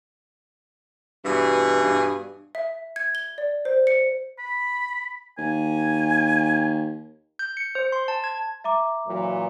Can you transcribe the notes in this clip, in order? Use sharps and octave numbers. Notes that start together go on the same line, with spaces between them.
G2 B2 E3 G#4
G2
E5
G#6
G7
D5
C5
C#7
B5
D#2 G#5
G6
C#7
C5
C6
A5
G#6
E5 A#5 D6
A#2 E3 F#3